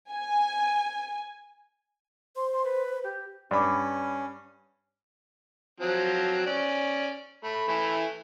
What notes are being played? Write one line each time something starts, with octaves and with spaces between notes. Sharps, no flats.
G#5
C5 C6
C6
B4
G4
G2 C#4 D5 B5 D6
F3 F#3 C4
C#4 D5
A3 B5
E3 A3 E4